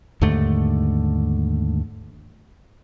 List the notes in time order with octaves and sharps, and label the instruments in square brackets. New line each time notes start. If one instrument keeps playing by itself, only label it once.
[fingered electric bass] D#2 G#2 D3 A3